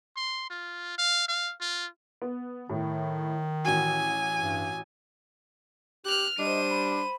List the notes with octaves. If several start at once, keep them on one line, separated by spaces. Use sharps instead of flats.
C6
F4
F5
F5
F4
B3
A2 D#3
A1 F#4 G#5
G2
G4 F6 F#6
G3 D4 C5 D#5 D#7
B5